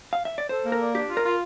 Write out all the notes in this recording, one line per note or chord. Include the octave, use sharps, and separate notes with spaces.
F5
E5
D5
A4 C5
A#3
A#4
D5
D4 G4
F4
A#4
F4